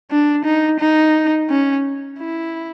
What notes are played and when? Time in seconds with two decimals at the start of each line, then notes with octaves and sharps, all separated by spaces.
0.11 D4
0.45 D#4
0.80 D#4
1.50 C#4
2.19 E4